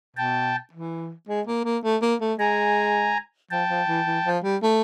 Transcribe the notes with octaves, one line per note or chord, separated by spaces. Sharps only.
B2 G5 A5
E3
G#3
A#3
A#3
A3
A#3
A3
G#3 G#5 A#5
F3 G5 A5
F3
E3
E3
F3
G3
A3